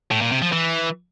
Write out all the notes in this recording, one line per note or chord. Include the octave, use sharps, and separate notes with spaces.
A2
A#2
C3
F3
E3